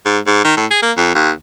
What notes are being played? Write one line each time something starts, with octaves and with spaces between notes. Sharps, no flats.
G#2
G#2
D#3
A2
G#4
A#3
F2
D#2